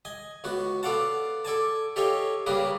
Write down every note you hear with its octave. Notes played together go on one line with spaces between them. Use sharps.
D#5 G#5
C#2 B3 F#4
B3 A4 D5 F5 F#5 A5
A4 D5 G#5 A5
G4 A4 C#5 D#5 F5 G#5
C#3 G3 A#3 G#4 A#4 B4